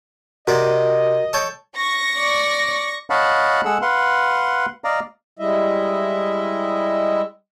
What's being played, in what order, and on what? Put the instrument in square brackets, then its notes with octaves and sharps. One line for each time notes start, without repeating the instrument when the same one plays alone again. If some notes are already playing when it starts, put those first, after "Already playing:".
[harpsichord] C3 D5 [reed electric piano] F#4 A#4 [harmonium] D#5
[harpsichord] A4 C#5 G5
[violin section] C#6 A#6
[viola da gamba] D5
[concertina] C#5 D#5 F5 F#5 A5 B5
G#3 G#4 A4 F#5 E6
B4 F5 F#5 C6
D5 D#5 F5 A#5
[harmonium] G3 G#3 E4 D#5 E5